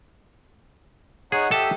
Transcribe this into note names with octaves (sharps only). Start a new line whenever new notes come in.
D#4 G#4 C#5 F#5
G4 A4 E5 A5 D#6